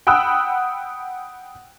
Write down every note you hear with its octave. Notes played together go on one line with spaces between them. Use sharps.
F#5 G5 B5 D#6 E6 F#6